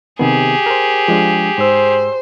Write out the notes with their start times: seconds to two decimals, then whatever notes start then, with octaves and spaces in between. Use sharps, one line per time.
0.19 C3 D#3 B3 G4 G#4
0.66 A#4 C5
1.08 F3 G#3 D4
1.58 G#2 C5 E6